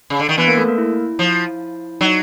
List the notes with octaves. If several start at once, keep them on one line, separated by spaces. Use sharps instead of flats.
C#3
D3
D#3
E3 B3 B4
A#3 A#4
A3 A4
A#3 A#4
E4
F3
F#3 D#4